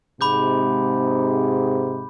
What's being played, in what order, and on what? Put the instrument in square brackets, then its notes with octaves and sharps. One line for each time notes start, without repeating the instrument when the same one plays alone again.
[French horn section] G#2 C3 [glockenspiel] B5 D6 G6